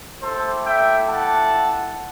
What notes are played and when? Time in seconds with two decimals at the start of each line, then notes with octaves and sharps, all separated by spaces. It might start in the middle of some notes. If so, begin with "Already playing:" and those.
0.21 A3 E4 G4 A4 C5
0.65 E5 G5
1.08 F#5 A5